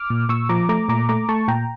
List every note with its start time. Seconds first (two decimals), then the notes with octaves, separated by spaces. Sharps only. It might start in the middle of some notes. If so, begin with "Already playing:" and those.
Already playing: D6 F6
0.10 A#2
0.29 A#2 C#6 E6
0.49 F3 A#5 D6
0.69 A3 A#5 D6
0.88 A#2 A#5 D6
1.09 A3 A#5 D6
1.29 A3 A5 C#6
1.48 A#2 G5 A#5